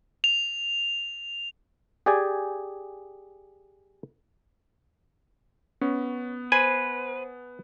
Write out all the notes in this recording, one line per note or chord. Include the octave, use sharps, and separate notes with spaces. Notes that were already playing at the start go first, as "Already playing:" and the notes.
F7
G4 G#4 D5 G5 G#5
B3 C#4
B4 C5 G#5